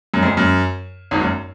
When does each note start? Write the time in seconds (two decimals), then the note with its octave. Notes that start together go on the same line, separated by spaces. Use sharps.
0.14 F#2
0.23 F2
0.37 F#2
1.11 G#1 G#2
1.21 F#2